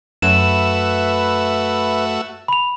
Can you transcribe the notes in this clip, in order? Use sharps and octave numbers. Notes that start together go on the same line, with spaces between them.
F#2 A3 F#4 B4 E5 E7
B5 F7